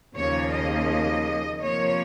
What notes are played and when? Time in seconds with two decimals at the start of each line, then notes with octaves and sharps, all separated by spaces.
0.14 D#2 C#3 F3 A#3 C#5
0.51 D#5
1.60 C3 F3 A#3 C#5